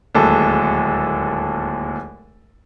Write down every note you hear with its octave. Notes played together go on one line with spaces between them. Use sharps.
D1 D#2 G#3 A4